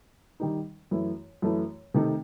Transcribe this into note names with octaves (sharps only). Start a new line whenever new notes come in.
D#3 G3 D#4
F#2 E3 A3 E4
F#2 E3 A3 E4
C3 D#3 A3 D#4